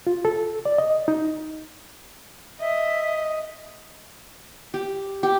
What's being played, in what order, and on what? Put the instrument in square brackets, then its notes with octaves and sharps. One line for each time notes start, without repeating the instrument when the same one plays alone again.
[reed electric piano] F4
A4
D5
D#5
D#4
[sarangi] D#5 [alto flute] E5
[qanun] G4
G4